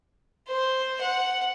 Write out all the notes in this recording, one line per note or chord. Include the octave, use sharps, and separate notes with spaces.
C5
F#5